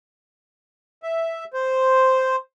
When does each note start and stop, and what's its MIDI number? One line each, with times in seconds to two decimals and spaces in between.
1.03 1.44 76
1.54 2.36 72